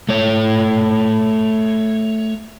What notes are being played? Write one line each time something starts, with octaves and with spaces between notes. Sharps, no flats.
A3 C#5